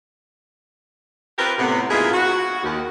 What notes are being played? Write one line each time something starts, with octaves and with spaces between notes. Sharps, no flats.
C4 F4 G4 A#4 B4
A2 C3 B3
G#2 B2 A#3 E4 F4 G#4
F#4
D#2